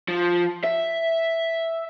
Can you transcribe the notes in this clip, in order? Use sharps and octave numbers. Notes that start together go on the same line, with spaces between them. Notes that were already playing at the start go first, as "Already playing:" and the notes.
F3
E5